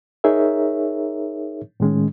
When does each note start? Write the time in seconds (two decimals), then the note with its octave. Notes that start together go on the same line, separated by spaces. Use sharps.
0.24 D#4 G#4 A#4 C#5 E5
1.80 A2 D#3 G#3 C#4